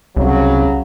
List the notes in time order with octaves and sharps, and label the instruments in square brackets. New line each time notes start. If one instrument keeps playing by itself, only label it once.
[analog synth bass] C2 [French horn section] C#3 F#3